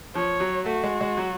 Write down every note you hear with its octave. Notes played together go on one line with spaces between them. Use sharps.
F3 C#5
F#3
A3 F#4
G#3
G#3
F#3